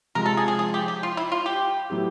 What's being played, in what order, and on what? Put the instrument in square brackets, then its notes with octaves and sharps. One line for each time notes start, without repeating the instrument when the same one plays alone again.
[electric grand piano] C3 F3 G#3 [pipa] A#4
[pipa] A4
G#4
G#4
G#4
G4
G4
F4
E4
F4
G4
[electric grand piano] A2 F#3 B3 E4 G4